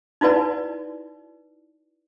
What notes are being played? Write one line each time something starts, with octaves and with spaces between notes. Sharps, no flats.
D#4 E4 F#4 B4 D5